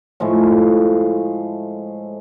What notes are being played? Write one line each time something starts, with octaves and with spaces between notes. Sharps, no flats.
A2 F3 G#3 A3